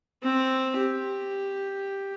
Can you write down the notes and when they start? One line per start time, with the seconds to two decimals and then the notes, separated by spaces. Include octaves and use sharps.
0.23 C4
0.77 G4